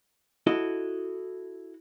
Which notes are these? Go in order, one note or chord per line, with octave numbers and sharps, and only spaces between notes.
E4 F#4 A4 D#5